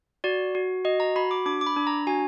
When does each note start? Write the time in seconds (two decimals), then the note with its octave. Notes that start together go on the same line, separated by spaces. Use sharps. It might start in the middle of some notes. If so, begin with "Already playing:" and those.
0.24 F#4 D5
0.55 F#4
0.85 F#4 D#5
1.00 A#5
1.16 F#4 B5
1.31 D6
1.46 D4 D6
1.61 D6
1.67 B5
1.76 D4
1.87 A#5
2.07 F#4 G#5